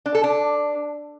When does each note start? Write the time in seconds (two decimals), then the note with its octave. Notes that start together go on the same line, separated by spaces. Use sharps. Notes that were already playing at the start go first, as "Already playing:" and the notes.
0.06 D4
0.15 A4
0.24 D4